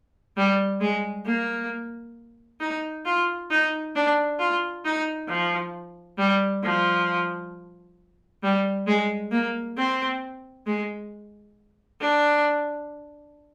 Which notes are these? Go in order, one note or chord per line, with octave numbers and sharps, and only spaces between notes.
G3
G#3
A#3
D#4
F4
D#4
D4
F4
D#4
F3
G3
F3
G3
G#3
A#3
C4
G#3
D4